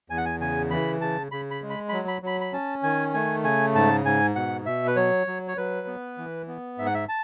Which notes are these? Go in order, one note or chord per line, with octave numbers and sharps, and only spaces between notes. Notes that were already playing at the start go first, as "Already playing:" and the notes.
E2 G#5
F#5
G#5
C#3 G#5
E3 B5
C#3 A5
C#3 B5
B5
G#3
B5
F#3 B5
B5
F#3 B5
B5
C#4 A5
D#3 G#5
A3 G#5
C#3 G#5
G#2 A5
G#2 G#5
B2 F#5
B2 E5
B4
F#3 C#5
F#3
C#5
F#3 B4
B3
E3
B3
G#2 E5
F#5
E5
A5